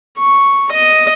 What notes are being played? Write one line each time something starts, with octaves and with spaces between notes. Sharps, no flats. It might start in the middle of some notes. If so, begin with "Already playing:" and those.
C#6
D#5